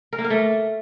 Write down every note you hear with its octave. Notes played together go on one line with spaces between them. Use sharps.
A#4
A#3
A#4
A3